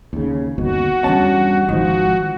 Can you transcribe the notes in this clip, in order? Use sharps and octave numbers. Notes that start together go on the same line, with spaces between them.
D#2 C#3
G1 D#2 B2 F#4
E2 G2 F3 C#4 A5
G#1 D#3 F3 F#4